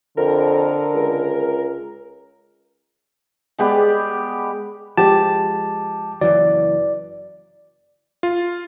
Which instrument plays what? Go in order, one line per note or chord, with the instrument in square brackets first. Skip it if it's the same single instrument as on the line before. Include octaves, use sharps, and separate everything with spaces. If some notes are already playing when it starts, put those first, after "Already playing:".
[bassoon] F2 [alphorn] D3 [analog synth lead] A#4
[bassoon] C#2
[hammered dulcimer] G#3 B3 G4 D5
[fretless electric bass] F3 G#3 [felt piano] G4 [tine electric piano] A5
[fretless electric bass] F#1 E3 F#3 [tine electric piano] D5
[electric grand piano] F4